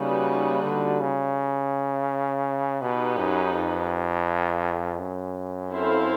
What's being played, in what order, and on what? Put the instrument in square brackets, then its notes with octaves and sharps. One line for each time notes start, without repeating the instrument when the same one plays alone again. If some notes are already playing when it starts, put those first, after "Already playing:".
Already playing: [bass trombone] C#3 [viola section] G3 A#3 D#4 F#4 B4
[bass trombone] D3
C#3
[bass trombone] B2 [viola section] D#4 G4 B4
[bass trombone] F#2
F2
F#2
[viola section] C4 E4 A4 C5 F5